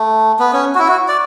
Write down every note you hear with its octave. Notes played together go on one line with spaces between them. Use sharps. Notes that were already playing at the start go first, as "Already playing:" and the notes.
Already playing: A3
B3
C#4
F#4
E4
F#4
D5